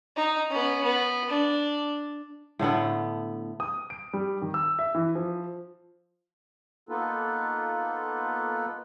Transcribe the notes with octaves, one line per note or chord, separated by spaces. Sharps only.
D#4
B3 C#4
B3
D4
A2 D3 A3 B3
D#6
D7
G3
D#3
E6
E5
E3
F3
A#3 B3 D#4 F4 A4 B4